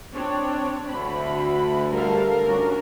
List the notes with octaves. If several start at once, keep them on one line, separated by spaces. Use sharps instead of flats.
C4 D4 C#5
D2 B5
G3 A4 A#4 F5
C#4 D4 F#4